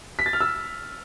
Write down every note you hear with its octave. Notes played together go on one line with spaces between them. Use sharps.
B6
A6
F6
E6